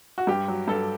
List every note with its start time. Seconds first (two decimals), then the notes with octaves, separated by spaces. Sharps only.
0.18 F#4
0.27 G2 G4
0.48 F#3
0.68 G2 A4